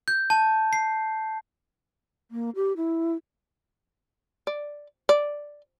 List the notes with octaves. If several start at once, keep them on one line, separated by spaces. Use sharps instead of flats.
G6
A5
C7
A#3
G4
E4
D5
D5